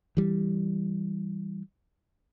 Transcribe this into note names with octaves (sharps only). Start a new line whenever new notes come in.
E3 G3